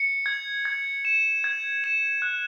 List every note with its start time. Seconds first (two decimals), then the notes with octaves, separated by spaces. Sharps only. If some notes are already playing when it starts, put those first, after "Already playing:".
Already playing: C#7
0.26 G#6
0.65 G#6
1.05 E7
1.44 G#6
1.84 E7
2.22 F#6